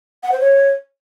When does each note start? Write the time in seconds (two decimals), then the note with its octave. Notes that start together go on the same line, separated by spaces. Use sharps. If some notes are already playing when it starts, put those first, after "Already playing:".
0.23 F#5
0.32 C5
0.40 C#5